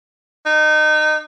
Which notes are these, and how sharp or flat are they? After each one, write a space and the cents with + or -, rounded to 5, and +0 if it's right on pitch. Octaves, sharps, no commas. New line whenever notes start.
D#4 -25